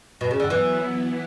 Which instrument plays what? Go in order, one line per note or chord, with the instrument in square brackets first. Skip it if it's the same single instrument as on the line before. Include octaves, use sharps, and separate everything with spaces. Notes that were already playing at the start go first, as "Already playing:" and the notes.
[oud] B2
C#3
D3
[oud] E3 [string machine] F#3 B3 E4
[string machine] E3 B3 E4